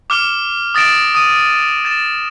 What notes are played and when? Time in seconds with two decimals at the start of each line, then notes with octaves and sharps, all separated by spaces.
0.10 D6 F6 E7 G7
0.75 D#6 A6 A#6 D7 E7
1.15 D#6 D#7
1.85 A6 E7